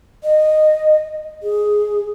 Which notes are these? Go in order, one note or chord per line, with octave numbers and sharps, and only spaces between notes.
D#5
G#4